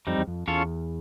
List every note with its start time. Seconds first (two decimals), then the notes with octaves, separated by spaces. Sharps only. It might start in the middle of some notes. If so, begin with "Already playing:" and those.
0.07 F2 G3 C4 D#4
0.18 E2
0.27 F2
0.48 E2 C#4 F4 A4 C#5